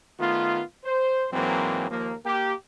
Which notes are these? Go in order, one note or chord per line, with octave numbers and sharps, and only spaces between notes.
D#3 A3 B3 F4
C5
G#2 E3 F#3 A#3 C4
D#2 F3 A#3
A#3 G4